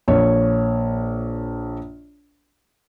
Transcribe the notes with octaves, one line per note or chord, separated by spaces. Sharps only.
A#1 C#5